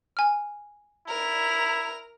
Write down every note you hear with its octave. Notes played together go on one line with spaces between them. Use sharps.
G#5 F6
E4 A#4 F7